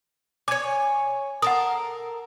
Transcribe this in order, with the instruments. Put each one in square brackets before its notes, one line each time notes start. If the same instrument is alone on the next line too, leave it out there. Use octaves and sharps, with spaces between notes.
[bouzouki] C#5 G#5 [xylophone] D6 G#6
[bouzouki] A4 A#4 [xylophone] F#5 D#6